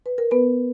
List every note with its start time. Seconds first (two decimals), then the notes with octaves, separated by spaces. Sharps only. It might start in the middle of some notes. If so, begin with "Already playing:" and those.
0.06 B4
0.18 A#4
0.31 B3 B4